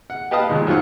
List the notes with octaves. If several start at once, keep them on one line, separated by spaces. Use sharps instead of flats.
F#5
G4 B4 D#5 F5 A5 D#6
D#2 A#2 G#3
F#2 D#3 F3 F4 F#5